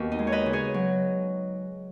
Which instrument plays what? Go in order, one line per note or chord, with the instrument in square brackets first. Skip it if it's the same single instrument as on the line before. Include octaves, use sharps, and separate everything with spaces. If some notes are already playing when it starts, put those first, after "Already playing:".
Already playing: [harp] D#2 B3 F#4 B4
D#4
G#3
C#5
B4 D#5
C#3
G#4 C#5
F#3